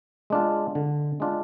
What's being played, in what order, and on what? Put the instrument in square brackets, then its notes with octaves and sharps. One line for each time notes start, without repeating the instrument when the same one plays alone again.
[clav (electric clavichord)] G#3 D4 F4
D3
G#3 D4 F4